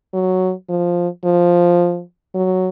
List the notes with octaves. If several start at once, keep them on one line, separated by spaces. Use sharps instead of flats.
F#3
F3
F3
F#3